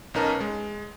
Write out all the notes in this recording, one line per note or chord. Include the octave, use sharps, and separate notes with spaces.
B1 C#4 D#4 A#4 B4 A5
G#3